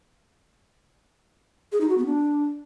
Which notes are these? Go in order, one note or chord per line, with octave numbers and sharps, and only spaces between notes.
G#4
D#4
F#4
B3
D4